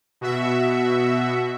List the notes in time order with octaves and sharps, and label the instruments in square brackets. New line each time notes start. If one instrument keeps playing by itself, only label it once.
[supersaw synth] B2 F#4 E5